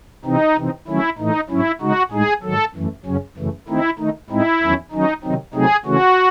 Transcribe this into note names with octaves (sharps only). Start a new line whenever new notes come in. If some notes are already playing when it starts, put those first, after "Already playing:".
C3 E3 C4 D#4
C3 E3 C4 D#4
D#3 F#3 A3 C#4 E4
A2 E3 A3 D#4
G#2 F#3 C#4 E4
C#3 G#3 D#4 F#4
A2 G#3 D#4 G#4
G#2 D#3 F#3 A4
F#2 E3 A3
F#2 C#3 F#3 C#4
F#2 C#3 E3 A3
D#3 A3 C4 D#4 E4
D#3 A3 D#4
A2 G#3 C4 D#4 E4
E2 D#3 F#3 C#4
D#3 F#3 C#4 D#4
C3 D#3 F#3 C4 D#4
C3 F#3 A3 C4 D#4 G#4
C#3 E3 A3 C#4 F#4